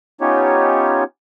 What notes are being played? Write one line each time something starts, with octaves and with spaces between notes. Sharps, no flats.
B3 C#4 D#4 F4 G4 C#5